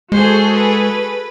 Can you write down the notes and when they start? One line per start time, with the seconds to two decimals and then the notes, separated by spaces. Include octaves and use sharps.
0.12 G#3 F#4 G#4 A4 C5
0.54 B4